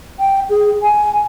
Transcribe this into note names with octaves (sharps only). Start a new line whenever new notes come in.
G5
G#4
G#5